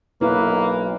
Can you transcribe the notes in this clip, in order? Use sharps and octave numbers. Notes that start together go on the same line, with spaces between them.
B1 A#3 E4 B4